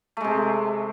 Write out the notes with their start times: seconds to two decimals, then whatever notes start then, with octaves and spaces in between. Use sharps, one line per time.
0.17 A3
0.21 G#3
0.24 C3